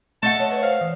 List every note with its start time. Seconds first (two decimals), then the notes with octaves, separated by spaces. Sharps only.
0.23 A3 D#5 F#5 A5
0.40 C#5
0.51 B4 C#5
0.63 C5 F5
0.81 E3